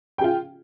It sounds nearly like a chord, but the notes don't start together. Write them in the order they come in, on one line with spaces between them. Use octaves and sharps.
G5 G#4 F4